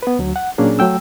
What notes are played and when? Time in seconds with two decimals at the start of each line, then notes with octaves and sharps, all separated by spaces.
0.03 B3 B4
0.19 D2 F#3
0.36 F#5
0.58 A#2 F#3 A#3 C#4 D4 G#4
0.79 F#3 A3 G5 E6